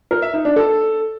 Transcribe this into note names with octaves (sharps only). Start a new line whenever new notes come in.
A#4
E5
D#4
D4
A4